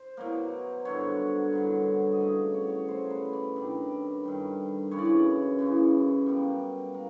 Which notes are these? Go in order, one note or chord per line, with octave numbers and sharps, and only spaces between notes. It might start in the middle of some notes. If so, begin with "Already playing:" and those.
Already playing: C5
B2 F#3 A#3
G2 D3 F#3 C#5
G2 D3 F#3
D#5
C#3 F#3 A3 D5
C#5
D5
C#5
C#3 F#3 A3 C5
B4
D5
G2 D#3 G3 D5
G2 D#3 G3
F#2 C#3 E3 C#5
D5
C#5
F#2 C#3 E3
B2 G3 A#3
A#3